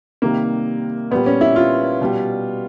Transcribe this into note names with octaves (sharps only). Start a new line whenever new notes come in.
C3 D#3 G3 A#3
A#2 G3 B3
C#4
E4
F4
B2 G3